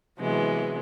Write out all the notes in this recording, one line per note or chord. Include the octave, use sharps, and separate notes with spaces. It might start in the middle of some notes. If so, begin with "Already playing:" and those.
C3 E3 F#3 G#3 B3